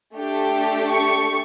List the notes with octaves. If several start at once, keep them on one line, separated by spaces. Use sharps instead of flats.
A3 D4 G4
C#6